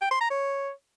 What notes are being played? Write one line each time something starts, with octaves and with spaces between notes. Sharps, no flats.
G5
C6
A#5
C#5